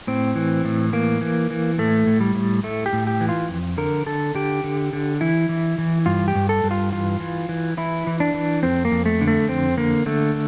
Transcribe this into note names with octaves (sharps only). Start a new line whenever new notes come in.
A2 C4
E3
A2
E3 A#3
E3
E3
A2 A3
A2
G3
A2
A2 A3
G4
A2
G4
E3
F4
F2
D3 A#4
D3 A4
D3 G4
D3
D3
E3 E4
E3
E3
G2 F4
G4
G2
A4
G2
F4
E3 F4
E3
E3
E3 E4
E3
D4
E3
F2 C4
A#3
F2
A3
D3
A3
F2 C4
D3 A#3
D3 A3